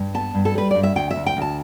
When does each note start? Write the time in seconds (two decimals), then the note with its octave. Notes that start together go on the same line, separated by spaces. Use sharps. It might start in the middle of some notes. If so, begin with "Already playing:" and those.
Already playing: G2
0.14 B3 A5
0.35 G2
0.45 A4
0.55 G3 B4
0.71 G2 D5
0.83 E5
0.96 D2 G5
1.11 E5
1.16 D2
1.26 G5
1.37 D2 A5